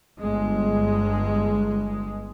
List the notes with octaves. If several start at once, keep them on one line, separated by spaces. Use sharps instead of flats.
G1 G#3